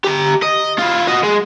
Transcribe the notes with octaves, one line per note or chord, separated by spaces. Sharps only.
G4 A#5
D#5
E4 F4
F#4 D#5
G#3